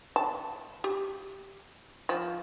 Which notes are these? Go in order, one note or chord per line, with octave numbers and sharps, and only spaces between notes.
A5
G4
F3